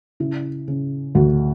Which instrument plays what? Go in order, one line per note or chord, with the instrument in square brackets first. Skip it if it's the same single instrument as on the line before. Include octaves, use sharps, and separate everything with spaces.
[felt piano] C#3 E4
C#3
D2 F#4